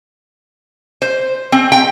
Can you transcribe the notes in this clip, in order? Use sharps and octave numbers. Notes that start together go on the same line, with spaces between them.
C5
C4
G5